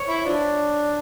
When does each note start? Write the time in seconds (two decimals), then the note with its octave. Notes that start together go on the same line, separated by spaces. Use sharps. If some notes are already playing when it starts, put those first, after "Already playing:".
Already playing: C#5
0.08 E4
0.25 F3 D4